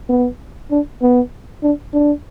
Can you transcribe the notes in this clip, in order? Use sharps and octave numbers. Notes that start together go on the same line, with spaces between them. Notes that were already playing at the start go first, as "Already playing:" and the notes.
B3
D4
B3
D4
D4